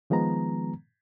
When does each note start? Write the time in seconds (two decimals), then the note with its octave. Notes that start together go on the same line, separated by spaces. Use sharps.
0.10 D#3 F3 G#3 B3 A#5